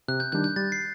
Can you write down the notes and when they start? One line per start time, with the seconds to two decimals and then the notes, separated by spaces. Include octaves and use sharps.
0.08 C3 F#6
0.20 G6
0.32 D#3 G3 D4 G6
0.44 G6
0.56 G3 A6
0.72 C7